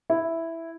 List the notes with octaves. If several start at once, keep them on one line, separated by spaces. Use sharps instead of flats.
E4